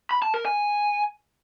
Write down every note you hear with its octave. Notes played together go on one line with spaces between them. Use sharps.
B5
A5
A#4
G#5